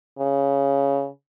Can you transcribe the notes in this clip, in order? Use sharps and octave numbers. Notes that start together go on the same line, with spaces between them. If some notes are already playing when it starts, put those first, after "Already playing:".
C#3